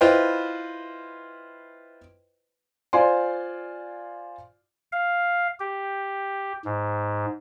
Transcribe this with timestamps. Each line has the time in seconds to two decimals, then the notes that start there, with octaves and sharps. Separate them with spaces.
0.01 E4 F4 B4 C5 D#5 G5
2.93 F4 C5 D5 F5 G#5 C6
4.92 F5
5.60 G4
6.65 G#2